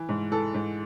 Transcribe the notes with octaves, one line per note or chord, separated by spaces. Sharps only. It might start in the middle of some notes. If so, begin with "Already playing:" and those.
Already playing: E3
G#2
E3 A4
G#2